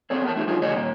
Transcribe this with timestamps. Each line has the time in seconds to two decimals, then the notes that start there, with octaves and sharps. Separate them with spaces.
0.10 C4 G#4 A4 C#5
0.24 B3 A#4 A5
0.36 A3 D#4 F4 G4
0.47 G3 A3 D4 D#4 F4 G#4
0.62 C#3 A3 G4 A4 C#5 D#5
0.76 A#2 G3 A#3